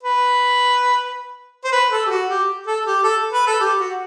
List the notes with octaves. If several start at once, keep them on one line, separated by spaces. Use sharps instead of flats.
B4
C5
B4
A4
G4
F#4
G4
A4
G4
A4
B4
A4
G4
F#4